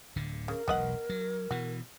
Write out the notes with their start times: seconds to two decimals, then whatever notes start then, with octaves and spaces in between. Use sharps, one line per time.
0.16 D1 D3
0.48 C#3 A#4
0.68 E1 B1 B3 D#5 F#5
1.10 F#3
1.51 B2 E3 F#4